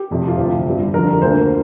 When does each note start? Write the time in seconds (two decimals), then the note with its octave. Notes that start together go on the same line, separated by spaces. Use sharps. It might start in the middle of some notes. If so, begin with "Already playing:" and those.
Already playing: G4
0.10 F1 F2 C3
0.28 F4
0.37 D2 C3 F3 C4 G4
0.66 G1 G2 G3
0.94 F2 D3 F3 A#4
1.08 A#4
1.22 D2 D3 A#3 C5